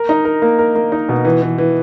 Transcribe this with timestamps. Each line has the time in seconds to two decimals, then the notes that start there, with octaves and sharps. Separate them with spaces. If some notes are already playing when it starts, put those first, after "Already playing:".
Already playing: A#4
0.09 D#4
0.25 A#4
0.42 A#3
0.59 A#4
0.75 A#3
0.92 D#4
1.09 B2
1.25 E3
1.42 E3
1.58 E3